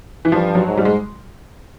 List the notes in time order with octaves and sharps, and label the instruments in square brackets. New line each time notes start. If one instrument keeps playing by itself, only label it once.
[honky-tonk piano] E3
[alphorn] G2 [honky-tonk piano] F3
[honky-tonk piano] F#3
[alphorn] G#2
[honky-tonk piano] G3
G#3